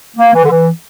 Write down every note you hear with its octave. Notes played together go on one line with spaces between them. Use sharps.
A#3
E3
D3
E3